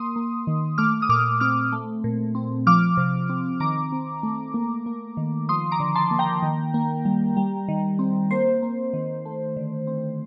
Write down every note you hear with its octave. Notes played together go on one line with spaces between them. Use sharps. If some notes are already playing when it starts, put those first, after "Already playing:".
Already playing: A#3 C6 D#6
A#3
D#3
A3 D6 F6
D#6
A#2 D6 F6
C4 D6 F6
A3
A#2
C4
F3 D6 F6
C3
C4
D#3 A#5 D6
C4
A3
A#3
A#3
D#3
F3 C6 D#6
A#5 D6
D3
A5 C6
A#3
G5 A#5
D#3
A#3
G3
G3
D#3
C4
A#3 C5
A#3
D#3
A3
D3
C4